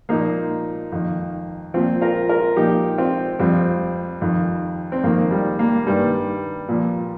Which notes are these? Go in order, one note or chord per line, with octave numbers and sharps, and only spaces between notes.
A#2 F3 A#3 D#4
F2 D#3
A#2 F3 C4 F4
F4 A#4
F4 A#4
A#2 F3 D#4 G4
C4 F4
F2 F3 G3 C4
F2 D#3
C4
F2 D#3 A#3
G3
A#3
G2 D#3 G3
A#2 F3